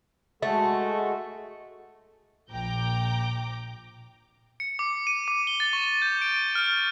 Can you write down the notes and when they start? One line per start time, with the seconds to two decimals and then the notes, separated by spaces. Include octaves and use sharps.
0.43 G#3 A3 F#4 A4
2.52 A#1 G5 A#5 D6 G6
4.60 C#7
4.79 D6
5.07 D#7
5.28 D6
5.47 G7
5.60 A6
5.73 C#6
6.02 G6
6.21 D7
6.55 F6